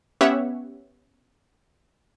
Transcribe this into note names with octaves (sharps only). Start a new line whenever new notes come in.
B3 C#4 G4 C#5 E5 F#5